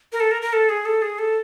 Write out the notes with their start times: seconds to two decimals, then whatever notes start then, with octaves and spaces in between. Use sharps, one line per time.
0.12 A#4
0.20 A4
0.31 A#4
0.42 A#4
0.53 A4
0.69 G#4
0.85 A4
1.02 G#4
1.19 A4